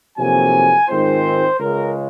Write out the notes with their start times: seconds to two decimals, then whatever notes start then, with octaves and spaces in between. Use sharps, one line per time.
0.17 F2 C3 D#3 F#3 A#3 G#5
0.88 G#2 D#3 G#3 C4 F4 C5
1.58 C#2 C#3 G#3 A#4